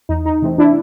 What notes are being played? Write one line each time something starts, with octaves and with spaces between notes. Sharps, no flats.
E2 D#4
D#4
C3 E3 A3 C4
D4 E4